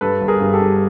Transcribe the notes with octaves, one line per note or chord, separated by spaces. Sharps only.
G2 A4 B4
G1
G#4 A#4
G2
G4 A4
G2